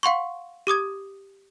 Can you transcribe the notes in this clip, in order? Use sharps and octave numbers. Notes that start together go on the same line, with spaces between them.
F5 F#5 C6 C#6
G4 D6 D#6 G#6